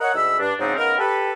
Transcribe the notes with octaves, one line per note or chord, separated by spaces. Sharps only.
A#4 C#5 D#5 F#5
D2 G#2 D#4 B5 E6
G2 D4
G#2 C#3 F#3 C4 D4 D#4
C#3 B3 D#4 A#4
G4 A4 B4